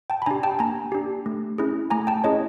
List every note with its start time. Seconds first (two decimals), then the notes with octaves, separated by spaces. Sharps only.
0.10 G5 A5
0.22 B5
0.26 D4 G4 G#5 A#5
0.43 G5 A5
0.59 A#3 G#5 A#5
0.92 D4 G4
1.26 A3
1.58 C#4 E4 G#4
1.90 A3 G#5 A#5
2.07 G5 A5
2.24 C#4 E4 G#4 C#5 D#5